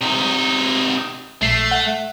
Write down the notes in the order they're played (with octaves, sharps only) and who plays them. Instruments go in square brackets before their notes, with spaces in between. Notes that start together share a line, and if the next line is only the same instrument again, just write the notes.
[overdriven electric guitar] C3 D#4
[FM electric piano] A#1 C7 [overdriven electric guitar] A3
[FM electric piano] F#5